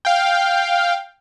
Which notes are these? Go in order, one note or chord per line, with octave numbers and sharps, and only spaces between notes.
F5 G5